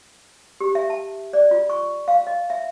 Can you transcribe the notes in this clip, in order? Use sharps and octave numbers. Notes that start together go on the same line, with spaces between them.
G4
E5
A5
D5
F4
C#6
F5
D#5
E5